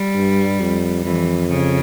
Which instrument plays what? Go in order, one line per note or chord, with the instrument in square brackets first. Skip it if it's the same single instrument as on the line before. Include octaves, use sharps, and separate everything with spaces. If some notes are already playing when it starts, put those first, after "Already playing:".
Already playing: [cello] G3
[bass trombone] G2
F2
[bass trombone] F2 [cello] E3
[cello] C#3